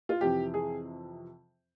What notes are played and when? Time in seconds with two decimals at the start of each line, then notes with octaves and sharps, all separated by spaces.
0.09 F4
0.21 F2 C3 E3 G4
0.54 G#4